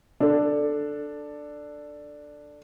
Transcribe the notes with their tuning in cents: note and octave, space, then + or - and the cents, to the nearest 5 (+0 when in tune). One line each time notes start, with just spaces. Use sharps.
D4 +5 A4 +5